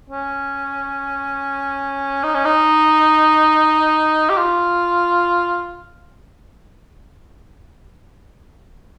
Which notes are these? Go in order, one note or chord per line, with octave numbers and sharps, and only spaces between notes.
C#4
D#4
C#4
D#4
G4
F4